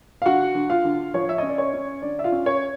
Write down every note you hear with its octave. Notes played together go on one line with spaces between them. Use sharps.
F5
D3 F#4 F#5
D3
F4 F5
D3
F3 C#5
E5
C#4 D#5
D5
C#5
C#4
D3 D5
E5
F4 F5
C#4
C#5